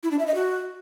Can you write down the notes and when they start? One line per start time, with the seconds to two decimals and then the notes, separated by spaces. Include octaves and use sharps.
0.03 E4
0.11 D4
0.19 E5
0.27 D#5
0.35 F#4